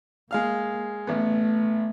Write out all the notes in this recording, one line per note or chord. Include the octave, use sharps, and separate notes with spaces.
G#3 A#3 F5 F6
A1 A3 B3